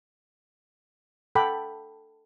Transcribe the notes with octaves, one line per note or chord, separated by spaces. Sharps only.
A4 F#5 G5 B5 D6